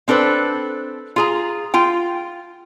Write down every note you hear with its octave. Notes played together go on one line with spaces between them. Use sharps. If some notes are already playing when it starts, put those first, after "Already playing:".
C4 D4 A4 B4 C5
F4 G#4 A#5
F4 G5